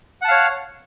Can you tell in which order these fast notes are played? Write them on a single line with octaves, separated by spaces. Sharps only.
F#5 A5 F5 C#5